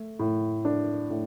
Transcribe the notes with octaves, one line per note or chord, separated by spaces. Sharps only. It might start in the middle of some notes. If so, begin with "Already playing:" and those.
Already playing: A3
A2
D4
A2